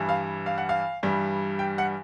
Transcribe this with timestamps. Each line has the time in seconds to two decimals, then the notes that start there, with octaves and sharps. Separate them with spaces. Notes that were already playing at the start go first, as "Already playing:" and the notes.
Already playing: G2 E3 G3
0.09 F5
0.46 F5
0.58 F#5
0.69 F5
1.03 G2 E3 G3
1.59 G5
1.78 F#5